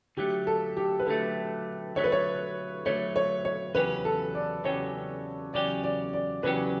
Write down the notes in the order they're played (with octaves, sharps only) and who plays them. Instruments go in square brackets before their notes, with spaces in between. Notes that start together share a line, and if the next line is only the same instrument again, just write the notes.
[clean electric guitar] D3 F#3 A3 [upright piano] G4
[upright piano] A4
G4
B4
[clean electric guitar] D3 F#3 A3 [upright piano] A4
[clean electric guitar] D3 F#3 A3 [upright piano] C#5
[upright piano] B4
C#5
[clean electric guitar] D3 F#3 A3 [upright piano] C#5
[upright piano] C#5
C#5
[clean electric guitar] E2 C#3 F#3 C#4 G4 [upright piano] B4
[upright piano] A4
D5
[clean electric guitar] E2 C#3 F#3 C#4 G4 [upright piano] C#5
[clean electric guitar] E2 C#3 F#3 C#4 G4 [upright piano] D5
[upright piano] D5
D5
[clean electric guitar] E2 C#3 F#3 C#4 G4 [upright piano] B4